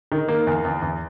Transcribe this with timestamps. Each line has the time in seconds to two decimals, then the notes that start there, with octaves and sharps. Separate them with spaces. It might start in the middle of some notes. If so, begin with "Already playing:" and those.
0.12 D#3
0.28 A#3
0.47 E2
0.65 E2
0.82 E2